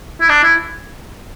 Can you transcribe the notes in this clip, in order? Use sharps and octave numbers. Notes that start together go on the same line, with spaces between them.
E4
D4
E4